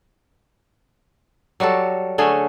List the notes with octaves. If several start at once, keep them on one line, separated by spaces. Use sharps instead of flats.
F#3 G3 F#4 A4
D3 A3 C#4 G#4